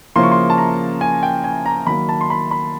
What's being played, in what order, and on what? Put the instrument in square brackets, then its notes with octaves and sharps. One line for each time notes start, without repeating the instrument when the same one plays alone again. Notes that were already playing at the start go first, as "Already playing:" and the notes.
[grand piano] C#3 F3 A#3 C#4 E4 C6
C#6
C6
A5
A#5
G#5
G5
G#5
A#5
D#3 F#3 A#3 B5
A5
C6
B5
B5